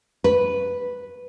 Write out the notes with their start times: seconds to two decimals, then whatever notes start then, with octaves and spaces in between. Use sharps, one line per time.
0.24 B4